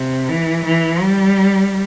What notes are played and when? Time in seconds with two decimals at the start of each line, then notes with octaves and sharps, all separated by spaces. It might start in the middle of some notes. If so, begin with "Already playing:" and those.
Already playing: C3
0.29 E3
0.65 E3
1.02 G3